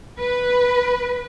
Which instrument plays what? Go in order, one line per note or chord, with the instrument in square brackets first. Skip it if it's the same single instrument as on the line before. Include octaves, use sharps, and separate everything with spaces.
[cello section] B4